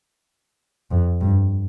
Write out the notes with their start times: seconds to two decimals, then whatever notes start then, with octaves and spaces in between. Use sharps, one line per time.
0.91 F2
1.21 G2